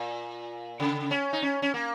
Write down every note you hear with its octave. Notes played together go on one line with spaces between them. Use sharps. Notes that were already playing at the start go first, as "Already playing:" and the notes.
Already playing: A#2
C#3
C#4
D#4
C#4
C#4
A#3